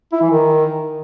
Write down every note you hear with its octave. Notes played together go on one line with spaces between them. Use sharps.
E4
E3
D#3